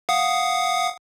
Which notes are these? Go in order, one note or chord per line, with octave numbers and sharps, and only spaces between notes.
F5 F#5 D#6